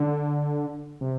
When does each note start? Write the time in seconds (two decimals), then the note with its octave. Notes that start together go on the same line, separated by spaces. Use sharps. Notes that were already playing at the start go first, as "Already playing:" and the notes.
Already playing: D3
1.01 C3